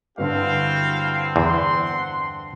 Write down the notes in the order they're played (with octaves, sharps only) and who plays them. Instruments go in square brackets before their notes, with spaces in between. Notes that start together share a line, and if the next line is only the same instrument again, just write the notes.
[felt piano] G2 D3 [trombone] C4 [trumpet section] E4 F#4 F5
[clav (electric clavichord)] E2 [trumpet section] F#5 C6